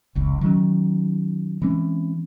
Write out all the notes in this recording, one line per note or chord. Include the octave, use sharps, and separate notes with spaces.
F1 C#2
D#3 F#3 C#4
E3 G#3 C4 C#4